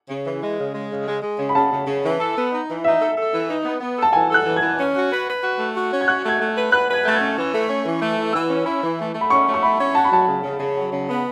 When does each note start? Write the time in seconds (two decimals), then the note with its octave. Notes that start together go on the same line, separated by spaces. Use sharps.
0.09 C#3
0.25 E3
0.41 G#3
0.58 C#3
0.75 G#3
0.90 C#3
1.07 G#3
1.22 G#3
1.39 C#3
1.49 B5
1.55 C#3 A5
1.71 C#3
1.87 C#3
2.03 E3
2.20 A4
2.36 B3
2.52 D#4
2.68 E3
2.84 D#4 E5
3.00 A4
3.17 A4
3.33 E3
3.48 D#4
3.65 B3
3.81 B3
3.97 A4
4.02 A5
4.13 E3 G#5
4.29 A4
4.34 F#6
4.46 E3
4.56 E3 G#6
4.77 C#4
4.94 F#4
5.10 B4
5.27 B4
5.42 F#4
5.58 A3
5.75 F#4
5.91 C#4
6.01 G#6
6.07 F#4 F#6
6.23 A3 G#6
6.40 A3
6.55 B4
6.72 B4 F#6
6.88 B4
6.93 G#6
7.04 A3 A6
7.15 G#6
7.20 C#4
7.37 E3
7.53 A3
7.68 C#4
7.85 E3
8.01 A3
8.17 E3
8.33 E3 E6
8.49 C#4
8.66 E4
8.82 E3
8.98 A3
9.14 A3
9.21 B5
9.30 C#4 C#6
9.46 A3
9.54 C#6
9.63 E4 B5
9.79 C#4
9.94 F#4 A5
10.04 B5
10.11 F#3 A5
10.27 C#3
10.43 C#3
10.59 C#3
10.76 F#3
10.91 C#3
11.08 B3